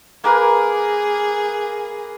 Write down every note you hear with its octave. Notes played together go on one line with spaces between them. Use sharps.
A#3 G#4 A#4 B4